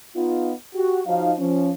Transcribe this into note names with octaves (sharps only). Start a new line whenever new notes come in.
B3 D#4 F4
F#4 G4
F3 F#3 D#4 F5
F3 C#4